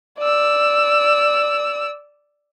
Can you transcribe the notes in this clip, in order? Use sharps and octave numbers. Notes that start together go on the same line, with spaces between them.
D5 E6